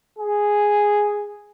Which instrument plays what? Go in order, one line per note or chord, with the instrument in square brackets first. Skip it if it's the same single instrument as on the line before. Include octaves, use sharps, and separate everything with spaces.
[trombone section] G#4